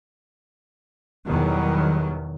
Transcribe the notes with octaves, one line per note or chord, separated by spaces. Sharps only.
E2 B2 D#3 F#3 G3